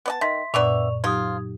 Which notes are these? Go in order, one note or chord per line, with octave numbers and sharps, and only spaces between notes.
B3 D5 A5
D#3 E5 C6 B6
F#2 A#2 B3 D4 D5 E5 C#6 F7
F3 F#3 D#4 F4 G4 D#6 G#6